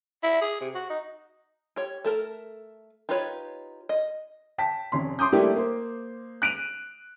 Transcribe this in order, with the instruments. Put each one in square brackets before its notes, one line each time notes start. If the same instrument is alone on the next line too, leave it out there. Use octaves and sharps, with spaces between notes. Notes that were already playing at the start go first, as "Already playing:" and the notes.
[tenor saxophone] E4
G#4
C3
F#4
D#4
[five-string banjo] G4 C#5
A3 A4 A#4
D#4 F4 G4 B4 C#5
D#5
[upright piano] G5 A5 B6
F1 C#4 C6
C6 D6 D#6 G6
G3 A3 A#3 D4 E4 G4
A#3 C5
F#6 D7 D#7 F7